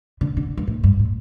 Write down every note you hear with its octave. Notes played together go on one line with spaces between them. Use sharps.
D3
D3
G2
A2
G2
A2